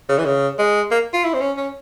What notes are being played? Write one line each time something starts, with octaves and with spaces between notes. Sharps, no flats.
C#3
E3
C#3
G#3
A#3
F4
E4
C4
C#4
C#4